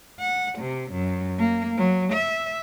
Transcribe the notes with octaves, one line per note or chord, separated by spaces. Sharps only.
F#5
C3
F#2
A#3
F#3
E5